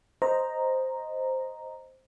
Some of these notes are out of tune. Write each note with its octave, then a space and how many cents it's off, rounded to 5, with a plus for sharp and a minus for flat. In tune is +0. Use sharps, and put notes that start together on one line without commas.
C5 +0 D#5 +0 A#5 +0